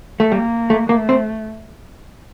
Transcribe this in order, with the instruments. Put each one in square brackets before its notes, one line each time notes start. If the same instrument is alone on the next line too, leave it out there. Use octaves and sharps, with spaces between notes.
[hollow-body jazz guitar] A3
[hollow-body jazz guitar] G3 [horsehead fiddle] A#3
[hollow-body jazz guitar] A3
[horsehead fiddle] A3 [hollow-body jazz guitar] A#3
[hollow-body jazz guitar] C4